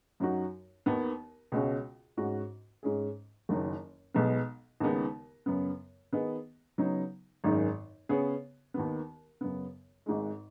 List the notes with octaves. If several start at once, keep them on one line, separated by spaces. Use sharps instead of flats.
F#2 F#3 D#4 F#4
D#2 D#3 B3
C#2 B2 G#3 C#4 F#4
G#2 G#3 C#4 F#4
G#2 G#3 C#4 G#4
F#1 F#2 D#3 F#3
B1 B2 G#3 B3
D#2 C#3 G#3 B3 D#4
F#2 C#3 B3
D#3 B3 G#4 B4 D#5
C#3 F#3 B3 D#4
G#1 F#2 D#3 G#3 D#4
C#3 B3 G#4 C#5
D#2 D#3 B3
F#2 C#3 B3
G#1 G#2 G#3